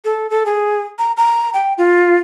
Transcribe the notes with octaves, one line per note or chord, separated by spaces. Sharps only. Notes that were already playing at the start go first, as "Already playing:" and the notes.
A4
A4
G#4
A#5
A#5
G5
F4